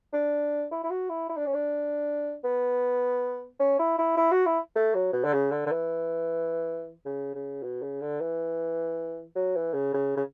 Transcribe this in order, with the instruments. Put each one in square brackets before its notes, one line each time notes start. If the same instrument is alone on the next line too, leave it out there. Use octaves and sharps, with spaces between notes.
[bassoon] D4
E4
E4
F#4
E4
E4
D4
C#4
D4
B3
C#4
E4
E4
E4
F#4
E4
A3
F#3
B2
D3
C#3
D3
D3
E3
C#3
C#3
B2
C#3
D3
E3
F#3
E3
C#3
C#3
C#3